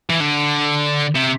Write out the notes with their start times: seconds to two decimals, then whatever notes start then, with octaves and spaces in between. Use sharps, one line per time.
0.10 E3
0.21 D3
1.15 C3